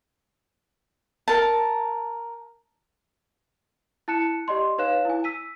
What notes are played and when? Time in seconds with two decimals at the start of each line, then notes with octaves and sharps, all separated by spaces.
1.28 A#4 A5
4.08 E4 A5 F#6 C#7 E7
4.48 G4 D5 D#5 C6
4.78 D#4 B4 C#5 F5 F#6 E7
5.05 E4 G#5
5.24 E6 B6 D#7